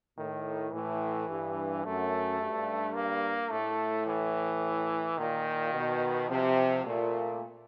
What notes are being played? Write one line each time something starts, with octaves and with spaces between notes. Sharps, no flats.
A2 D#3
A2 E3
G2
F#2 A3
G2
A#3
A2 A3
E3
A#2 D#3
B2
C3 F3
A#2 A3